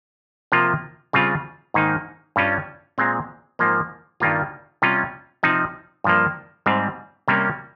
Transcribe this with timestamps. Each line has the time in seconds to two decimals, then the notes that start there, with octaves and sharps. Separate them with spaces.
0.52 C3 F3 A#3 F4
1.13 C#3 G3 C4 F4
1.74 G#2 D#3 A#3 D#4
2.36 G2 G3 C#4 F4
2.98 A#2 G#3 C4
3.59 G#2 F3 A#3
4.20 G2 D#3 G3 A#3 F4
4.82 C3 G3 C#4 F4
5.43 C3 F3 C4 D#4
6.04 G2 F3 A#3
6.66 G#2 G3 C4
7.28 C3 G3 A#3 C#4